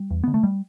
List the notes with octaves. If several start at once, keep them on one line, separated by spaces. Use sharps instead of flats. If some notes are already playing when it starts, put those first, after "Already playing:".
Already playing: G3
E2
D3 B3
A3
G3